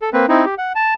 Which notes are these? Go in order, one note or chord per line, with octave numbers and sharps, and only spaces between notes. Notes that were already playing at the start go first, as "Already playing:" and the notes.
A4
A#3 C4 B4
C4 D#4 E4
G4
F#5
A5